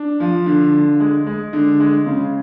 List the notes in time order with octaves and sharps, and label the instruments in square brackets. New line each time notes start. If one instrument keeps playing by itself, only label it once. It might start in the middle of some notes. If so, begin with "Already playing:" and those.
Already playing: [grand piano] D4
F3
D3
D3
G#3
G#3
D3
G#3
C#3